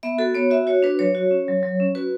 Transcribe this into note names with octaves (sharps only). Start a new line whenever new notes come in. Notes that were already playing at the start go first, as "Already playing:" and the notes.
B3 E5
F#4 A4
B3 C#5
F#4 E5
F#4 C#5
D4 B4
F#3 C#5
F#4
C#4
F#3
F#3
C#4
F#4 B4